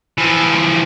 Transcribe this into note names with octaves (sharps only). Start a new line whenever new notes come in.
E3 F3